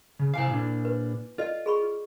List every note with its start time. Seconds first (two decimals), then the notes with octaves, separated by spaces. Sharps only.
0.19 C#3
0.34 C3 E4 F5 G#5 D6
0.51 A#2 D4
0.85 B4
1.38 F4 A4 D5 D#5
1.66 G#4 B5 C#6